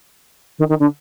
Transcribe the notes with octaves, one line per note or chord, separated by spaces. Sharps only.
D#3
D#3
D3